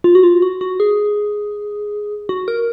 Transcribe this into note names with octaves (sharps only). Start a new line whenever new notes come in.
F4
F#4
F4
F#4
F#4
G#4
F#4
A#4